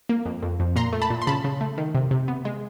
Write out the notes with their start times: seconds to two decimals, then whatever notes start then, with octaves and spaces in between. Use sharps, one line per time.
0.09 A#3
0.26 F2
0.43 F2
0.60 F2
0.76 A#2 A#5 C6
0.93 A3
1.02 A5 B5
1.10 A#2
1.22 C6
1.27 C#3 A5 B5
1.44 C#3
1.61 A3
1.78 D#3
1.95 C3
2.11 C3
2.28 B3
2.45 G#3